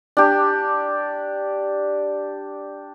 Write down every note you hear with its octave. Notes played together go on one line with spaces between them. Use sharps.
D4 G4